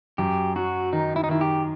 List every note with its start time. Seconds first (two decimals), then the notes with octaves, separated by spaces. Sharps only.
0.18 F#2 G4
0.56 F#3 F#4
0.93 D#3 D#4
1.16 E4
1.24 D#4
1.29 D#3 E4
1.41 G4